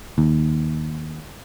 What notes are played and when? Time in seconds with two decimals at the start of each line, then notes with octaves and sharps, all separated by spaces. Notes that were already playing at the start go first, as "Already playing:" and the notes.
0.18 D#2